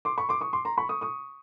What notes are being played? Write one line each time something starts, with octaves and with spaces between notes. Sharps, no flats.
C6 D6
B5 C#6
C6 D6
C#6 D#6
C6 D6
A#5 C6
B5 C#6
C#6 D#6
C#6 D#6